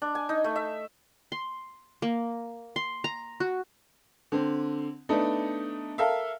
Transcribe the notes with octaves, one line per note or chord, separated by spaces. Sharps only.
D4
G#5
D#4
A3
E5
C6
A#3
C6
A#5
F#4
D3 C4
A3 B3 D4 D#4
A4 A#4 E5 F5